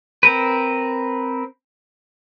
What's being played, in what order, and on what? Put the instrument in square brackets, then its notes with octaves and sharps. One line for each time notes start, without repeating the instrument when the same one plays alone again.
[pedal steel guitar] C4 A#4 B4